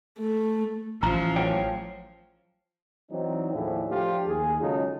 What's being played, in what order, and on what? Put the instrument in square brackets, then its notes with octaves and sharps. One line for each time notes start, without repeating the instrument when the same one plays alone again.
[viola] A3
[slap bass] A1 [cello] F3 [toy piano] A#5
[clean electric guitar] F#2 C#5 G5
[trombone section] E3 F#3 C4 D4 D#4
D#2 A2 F3 D4 E4 G#4
F3 A3 D4 F4 G4
D#2 G#4
C#3 F#3 G#3 D#4 F4 A4